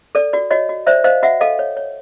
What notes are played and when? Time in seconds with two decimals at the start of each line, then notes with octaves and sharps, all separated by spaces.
0.15 A4 D5
0.33 F#4 D5
0.51 F#4 C#5 D#5
0.69 F#4
0.87 C5 D5 E5
1.04 C5 D#5 F5
1.23 F#4 E5 F#5
1.41 A4 D#5 F5
1.59 C#5
1.77 C#5